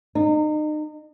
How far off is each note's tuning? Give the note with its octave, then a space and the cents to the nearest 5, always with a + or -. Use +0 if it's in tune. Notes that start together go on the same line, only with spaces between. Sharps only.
D#4 -35